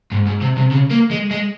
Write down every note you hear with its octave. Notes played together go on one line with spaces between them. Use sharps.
G#2
G#2
C3
C3
C#3
A#3
G#3
G#3